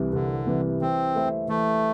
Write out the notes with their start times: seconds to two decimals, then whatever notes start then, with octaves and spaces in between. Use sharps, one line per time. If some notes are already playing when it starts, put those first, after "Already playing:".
Already playing: C2 C3 E3 G3
0.13 C2 D3
0.47 C3 E3 G3
0.81 E3 C4
1.15 A3 E4 C5 E5
1.48 E3 A3